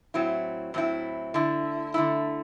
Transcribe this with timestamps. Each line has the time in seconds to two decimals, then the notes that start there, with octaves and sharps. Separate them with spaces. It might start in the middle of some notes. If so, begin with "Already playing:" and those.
0.14 A2 F#3 C4 E4
0.74 A2 F#3 C4 E4
1.34 D3 A3 E4
1.94 D3 A3 E4